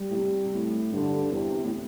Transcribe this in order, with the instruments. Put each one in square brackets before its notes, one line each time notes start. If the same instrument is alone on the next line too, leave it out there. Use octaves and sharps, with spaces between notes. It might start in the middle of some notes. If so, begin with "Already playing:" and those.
Already playing: [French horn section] G3
[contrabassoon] A2
C3
C3
A2
[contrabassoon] G2 [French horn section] D3
[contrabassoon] E2 [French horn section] C3
[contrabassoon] A2